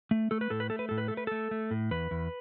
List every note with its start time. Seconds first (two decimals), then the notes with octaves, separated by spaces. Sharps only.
0.11 A3
0.31 A3 A4
0.41 B4
0.50 A2 A4
0.60 B4
0.70 A3 A4
0.79 B4
0.89 A2 A4
0.98 B4
1.08 A3 A4
1.17 B4
1.27 A3 A4
1.51 A3
1.71 A2
1.91 E2 B4
2.11 E2